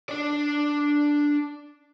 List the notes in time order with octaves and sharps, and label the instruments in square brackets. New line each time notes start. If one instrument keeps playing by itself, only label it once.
[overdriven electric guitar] D4 D5